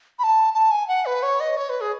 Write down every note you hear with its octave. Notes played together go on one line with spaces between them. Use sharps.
B5
A5
A5
G#5
F#5
B4
C#5
D#5
C#5
B4
G#4